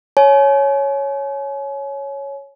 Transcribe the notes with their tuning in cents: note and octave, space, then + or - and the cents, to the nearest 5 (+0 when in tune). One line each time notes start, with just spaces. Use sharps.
C#5 +0 G#5 +40